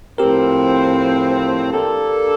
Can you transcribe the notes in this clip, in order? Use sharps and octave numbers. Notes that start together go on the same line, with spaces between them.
A2 F3 C4 G4 A#4
A#3 D4 A4